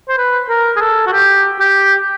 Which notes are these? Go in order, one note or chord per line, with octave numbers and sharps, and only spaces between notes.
C5
B4
A#4
G#4
A4
F#4
G4
G4